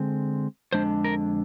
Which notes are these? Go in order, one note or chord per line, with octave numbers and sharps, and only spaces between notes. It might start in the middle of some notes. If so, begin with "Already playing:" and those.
Already playing: D3 G#3 C4
F2 D3 G#3 D4 C5
A#4